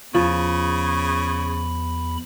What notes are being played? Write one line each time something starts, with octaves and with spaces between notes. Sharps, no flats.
E2 C#3 F3 B5